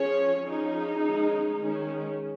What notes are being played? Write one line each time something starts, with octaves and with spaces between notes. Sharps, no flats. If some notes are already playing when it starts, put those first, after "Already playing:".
Already playing: F3 C#4 G#4 C#5
F3 C#4 D#4 G#4
D#3 G#3 C#4
D#3 G#3 C#4